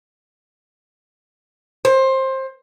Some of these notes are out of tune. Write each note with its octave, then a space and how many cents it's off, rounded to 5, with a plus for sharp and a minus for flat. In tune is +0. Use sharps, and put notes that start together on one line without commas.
C5 +20